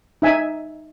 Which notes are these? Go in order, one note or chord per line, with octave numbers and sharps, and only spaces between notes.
D#4 E5 G#5